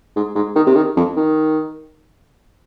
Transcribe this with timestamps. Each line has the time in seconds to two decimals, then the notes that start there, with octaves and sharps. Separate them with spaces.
0.16 G#2
0.35 G#2
0.56 D#3
0.67 C3
0.75 D#3
0.97 F2
1.16 D#3